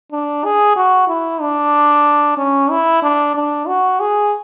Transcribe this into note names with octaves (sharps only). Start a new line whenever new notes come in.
D4
G#4
F#4
E4
D4
C#4
E4
D4
D4
F#4
G#4